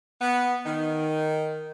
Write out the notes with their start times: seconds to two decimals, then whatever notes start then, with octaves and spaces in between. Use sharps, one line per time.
0.21 B3
0.66 D#3